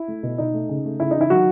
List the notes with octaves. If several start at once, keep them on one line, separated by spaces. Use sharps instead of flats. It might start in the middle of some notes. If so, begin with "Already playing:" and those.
Already playing: E4
A3
B2
B2 D#4
A3
C#3
A3
C#3 E4
D#4
E3 E4
D#3 F#3 F#4